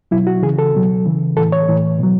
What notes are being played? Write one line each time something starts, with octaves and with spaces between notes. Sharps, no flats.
B2 F#3 E4
F#4
C#3 E3 G#4
A4
B2 F#3
C#3 E3
A2 E3 A4
C#5
A2 E3
B2 F#3